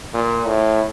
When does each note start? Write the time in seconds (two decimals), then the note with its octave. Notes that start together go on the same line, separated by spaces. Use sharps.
0.13 A#2
0.46 A2